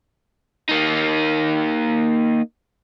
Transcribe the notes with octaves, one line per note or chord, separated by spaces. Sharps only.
A#3 D#4